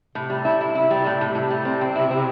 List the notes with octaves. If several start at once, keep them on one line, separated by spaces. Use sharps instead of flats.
A2 C3
G3
E4
E4
E4
G3
A2
A2
A2 C3
G3
C4
C4
E4
C4